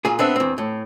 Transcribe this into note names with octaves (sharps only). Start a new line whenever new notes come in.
A#2 F4 G#4
B3 C4 D4 E5
E2 C4
A2